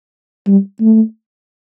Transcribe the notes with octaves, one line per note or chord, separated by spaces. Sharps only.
G3
A3